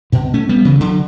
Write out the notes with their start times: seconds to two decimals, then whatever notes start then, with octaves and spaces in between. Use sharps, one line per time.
0.12 B2 D3
0.34 A3 C#4
0.49 G3 B3
0.65 C#3 E3
0.80 D3 F#3